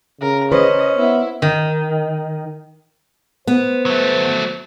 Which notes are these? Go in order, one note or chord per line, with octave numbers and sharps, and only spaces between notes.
C#3 A#4
C#4 B4 C5 D#5
B3 E4
D#3
B3 C5
F#3 A3